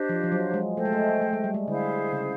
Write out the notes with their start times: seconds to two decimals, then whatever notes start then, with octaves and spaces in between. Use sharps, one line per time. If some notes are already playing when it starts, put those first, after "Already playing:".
Already playing: D4 G4 C5 D#5
0.09 F3
0.24 F3
0.32 F#3
0.54 G#3
0.76 A3 A4 C5 D#5 G5
0.85 G#3
0.93 A3
1.22 A3
1.33 G#3
1.44 G3
1.54 G#3
1.68 D3 E4 G#4 C5 F5
2.13 C#3